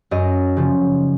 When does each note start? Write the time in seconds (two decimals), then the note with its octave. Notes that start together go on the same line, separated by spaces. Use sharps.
0.11 F#2 D#5
0.57 C#3 F3